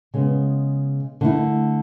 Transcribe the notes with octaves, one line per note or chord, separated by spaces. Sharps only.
C#3 G#3 B3
D3 A3 E4